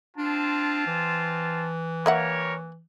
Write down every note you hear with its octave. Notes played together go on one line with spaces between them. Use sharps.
C4 D4 F4 A5
E3
G3 A#3 A#4 C#5 E5 F#5